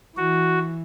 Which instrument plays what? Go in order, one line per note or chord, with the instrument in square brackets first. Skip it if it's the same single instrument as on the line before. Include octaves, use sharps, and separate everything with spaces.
[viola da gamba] E3 [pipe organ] F#4